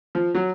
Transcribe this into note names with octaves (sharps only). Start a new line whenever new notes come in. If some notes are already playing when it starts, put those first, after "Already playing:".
F3
F#3